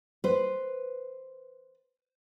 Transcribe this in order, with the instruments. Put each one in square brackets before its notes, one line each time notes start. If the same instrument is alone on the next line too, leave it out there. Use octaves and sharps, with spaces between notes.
[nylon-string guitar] B4 C5